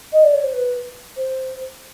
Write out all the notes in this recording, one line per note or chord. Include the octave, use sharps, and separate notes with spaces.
D#5
D5
C#5
C5
B4
C5